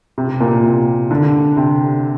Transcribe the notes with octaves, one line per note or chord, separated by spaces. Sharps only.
C3
A#2
C3
D3
C3